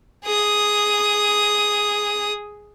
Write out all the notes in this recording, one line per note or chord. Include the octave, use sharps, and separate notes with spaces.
G#4 D#6